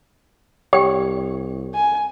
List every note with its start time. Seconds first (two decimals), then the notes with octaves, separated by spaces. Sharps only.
0.73 C2 G4 C#5 G5
1.74 G#5